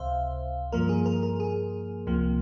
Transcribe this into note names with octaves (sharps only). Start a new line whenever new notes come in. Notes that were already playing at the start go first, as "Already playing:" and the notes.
Already playing: C#2 C3 C5 E5 F5
G2 F3 A#3 A#4
G#4
A#4
A#4
G#4
C#2 C3 F3 A#3